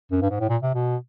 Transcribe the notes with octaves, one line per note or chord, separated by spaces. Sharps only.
F#2
G2
G#2
A2
A#2
C3
B2